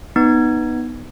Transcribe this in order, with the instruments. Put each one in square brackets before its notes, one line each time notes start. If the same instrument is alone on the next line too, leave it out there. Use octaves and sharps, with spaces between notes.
[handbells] B3 D#4 G#6